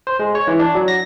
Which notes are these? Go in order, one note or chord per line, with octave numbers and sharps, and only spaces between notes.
C5
G#3
C#5
E3
D4
F#3
A#6